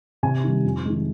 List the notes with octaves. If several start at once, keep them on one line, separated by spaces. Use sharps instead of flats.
C3 G#5
D#3 G3
F2
D#3 G#3